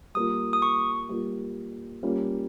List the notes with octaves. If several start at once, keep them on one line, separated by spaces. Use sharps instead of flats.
G3 A#3 F4 D#6
D#6
C#6
G3 A#3 F4
G3 A#3 C#4 F4